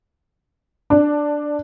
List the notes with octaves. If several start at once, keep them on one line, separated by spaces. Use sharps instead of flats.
D4